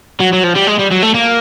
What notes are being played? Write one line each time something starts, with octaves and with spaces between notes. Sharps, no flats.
F#3
F#3
F3
G3
G#3
G3
F#3
A3
A#3